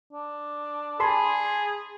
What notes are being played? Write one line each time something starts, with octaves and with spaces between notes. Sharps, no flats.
D4
G#4 A5 B5 C6